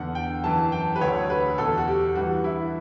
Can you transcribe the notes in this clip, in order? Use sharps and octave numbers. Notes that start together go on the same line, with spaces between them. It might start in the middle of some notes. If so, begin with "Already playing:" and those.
Already playing: E2 D3 F#5
G5
F#2 E3 A5
G5
B4
D2 D3 C#5
B4
E2 B2 A4
F#4
G4
G2 E3 F#4
E4